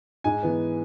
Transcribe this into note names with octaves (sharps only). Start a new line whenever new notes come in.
G#2 G#5
E3 B3